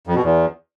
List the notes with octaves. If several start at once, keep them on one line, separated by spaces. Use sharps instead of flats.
F2
B2
E2